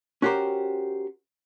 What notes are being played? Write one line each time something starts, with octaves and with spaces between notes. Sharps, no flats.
C#4 F#4 G4 A#4 C5